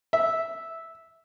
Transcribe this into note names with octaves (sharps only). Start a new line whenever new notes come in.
E5